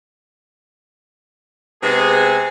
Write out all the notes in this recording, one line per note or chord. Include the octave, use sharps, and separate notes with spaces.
C3 G#3 B3 G#4